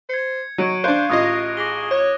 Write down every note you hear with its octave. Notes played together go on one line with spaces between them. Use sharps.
C5 G#6 C#7
F#3 D#4 C#6 D7 D#7
D4 C5 F5 F#6
A1 F4 D#5 D#6 G#6 A#6
G#4 D6 A#6 G7
C#5